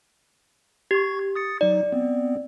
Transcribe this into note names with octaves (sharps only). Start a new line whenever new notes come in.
G4 C#6 G#6
D#6 A6 C#7
F#3 D#4 D5
B3 C4